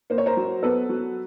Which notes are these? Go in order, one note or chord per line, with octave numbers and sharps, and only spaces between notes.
A#3 C5
C#5
A#4 C5
F#3
B3 A4 B4
F#3